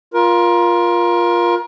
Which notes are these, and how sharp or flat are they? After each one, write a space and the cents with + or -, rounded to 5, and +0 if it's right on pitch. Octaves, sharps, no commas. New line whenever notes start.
F4 +0 A#4 +30